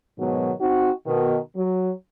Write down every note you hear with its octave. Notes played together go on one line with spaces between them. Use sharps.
G#2 B2 D#3 F#3
C4 D#4 F#4
B2 D#3
F#3